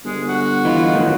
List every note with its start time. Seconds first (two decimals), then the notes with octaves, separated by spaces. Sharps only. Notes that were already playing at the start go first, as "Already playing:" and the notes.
0.05 G1 G#3
0.28 F#4
0.65 E3 E4 F4 D#5
0.94 A2 D#3 F#3